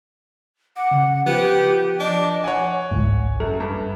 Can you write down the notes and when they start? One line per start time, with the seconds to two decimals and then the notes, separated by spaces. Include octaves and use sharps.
0.76 F#5 D6
0.91 C#3
1.26 F3 B3 G4
1.99 D4 D#5
2.44 C#5 F#5 G#5
2.91 G#1 C#2 G#2
3.40 F#2 A4
3.60 G2